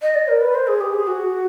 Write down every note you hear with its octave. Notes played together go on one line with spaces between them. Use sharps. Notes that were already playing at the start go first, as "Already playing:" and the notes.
D#5
D5
A#4
B4
C5
G#4
G4
G#4
F#4